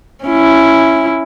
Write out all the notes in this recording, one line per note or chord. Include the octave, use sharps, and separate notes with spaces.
C#4 E4